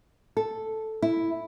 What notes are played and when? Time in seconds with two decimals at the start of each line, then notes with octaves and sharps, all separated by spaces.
0.37 A4
1.02 E4